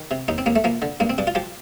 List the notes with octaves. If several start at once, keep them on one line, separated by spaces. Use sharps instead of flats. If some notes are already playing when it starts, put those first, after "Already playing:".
Already playing: D#3
C3
D#2 D#4
C4
D#2 A#3
A3
F3 A#3
D3
G2 A#3
C4
G2 D4
F4
F3 G4